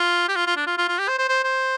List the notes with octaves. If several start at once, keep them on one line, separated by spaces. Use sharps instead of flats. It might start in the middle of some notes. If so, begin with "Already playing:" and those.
Already playing: F4
G4
F4
F4
D4
F4
F4
F4
G4
C5
C5
C5
C5